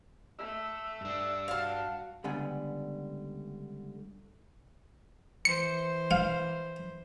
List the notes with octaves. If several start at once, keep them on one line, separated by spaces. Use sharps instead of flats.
A3 E6
G2 D4
F#4 F5 A5
C#2 D3 G3 B3 G#5
E3 C5 C#7
F5